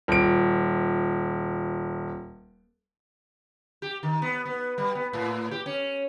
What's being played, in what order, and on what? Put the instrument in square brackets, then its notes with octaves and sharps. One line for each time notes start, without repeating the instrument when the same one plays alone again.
[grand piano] D#1 D7
[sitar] G4
D#3
B3
B3
G3
B3
A2
G4
C#4